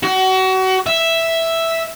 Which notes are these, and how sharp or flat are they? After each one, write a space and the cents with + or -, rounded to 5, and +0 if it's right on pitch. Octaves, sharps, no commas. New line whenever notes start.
F#4 +30
E5 +0